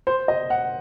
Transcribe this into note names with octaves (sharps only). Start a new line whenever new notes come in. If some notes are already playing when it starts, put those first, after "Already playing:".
C5
D#5
F#5